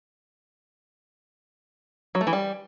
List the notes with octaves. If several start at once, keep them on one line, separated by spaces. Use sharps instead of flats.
F#3
A3
E3
G3